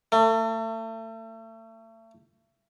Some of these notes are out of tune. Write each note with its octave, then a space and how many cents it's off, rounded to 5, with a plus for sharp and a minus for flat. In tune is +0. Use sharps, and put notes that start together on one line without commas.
A3 +35